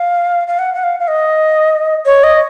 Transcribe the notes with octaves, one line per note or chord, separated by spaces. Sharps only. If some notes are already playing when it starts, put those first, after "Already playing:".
Already playing: F5
F5
F#5
F#5
F5
F5
D#5
C#5
D#5